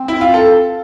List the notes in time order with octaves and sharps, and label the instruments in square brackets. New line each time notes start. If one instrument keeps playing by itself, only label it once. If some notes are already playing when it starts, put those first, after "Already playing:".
Already playing: [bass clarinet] C4
[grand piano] E4
F4
A4